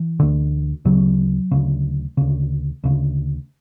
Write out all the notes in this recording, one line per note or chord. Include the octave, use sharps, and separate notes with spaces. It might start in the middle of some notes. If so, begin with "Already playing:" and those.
Already playing: E3
D2 D3
D2 C#3 F#3
D2 C#3
D2 C#3
D2 C#3